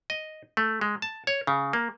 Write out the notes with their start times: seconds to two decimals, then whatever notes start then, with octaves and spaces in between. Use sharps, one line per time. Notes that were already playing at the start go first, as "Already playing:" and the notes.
0.10 D#5
0.57 A3
0.81 G#3
1.02 A5
1.27 C#5
1.47 C#3
1.73 A#3